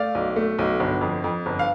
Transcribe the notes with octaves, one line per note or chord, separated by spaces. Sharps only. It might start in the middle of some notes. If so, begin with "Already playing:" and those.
Already playing: A3 D5 F5
B1
A3
B1
G1
F2
F2
G1
F5